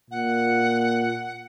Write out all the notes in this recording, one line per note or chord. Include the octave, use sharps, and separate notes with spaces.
A#2 F#5